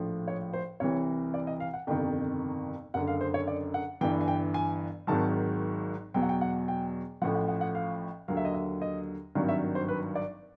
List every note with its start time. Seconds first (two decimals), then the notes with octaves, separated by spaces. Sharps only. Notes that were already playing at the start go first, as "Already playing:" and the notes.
Already playing: A#1 A2 F3
0.28 C#5
0.53 C5
0.80 C2 C3 E3 C#5
1.34 D5
1.47 D#5
1.60 F5
1.74 F#5
1.87 G1 F2 C3 D#3 G5
2.94 F#1 F#2 D3 F#5
3.07 F5
3.21 C5
3.34 C#5
3.47 D5
3.74 F#5
4.01 G1 G2 E3 G5
4.21 G#5
4.28 G5
4.54 G#5
5.07 G#1 G#2 D#3 F#3 A5
6.14 E2 B2 F#3 G5
6.22 F#5
6.29 G5
6.41 F#5
6.68 G5
7.22 A1 A2 F3 F#5
7.35 F#5
7.48 F#5
7.61 F#5
7.75 F5
8.28 D#2 D3 F#3 F5
8.37 E5
8.45 D#5
8.54 E5
8.82 D#5
9.35 G#1 G2 D#3 F#3
9.49 E5
9.75 C5
9.88 B4
10.15 D5